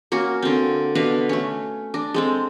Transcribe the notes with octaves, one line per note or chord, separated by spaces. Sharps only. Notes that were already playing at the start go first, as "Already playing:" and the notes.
A#3 C#4 F#4
D3 C4
B2 D4 B4 F5
A3 C#4
D4
G#3 C4 A4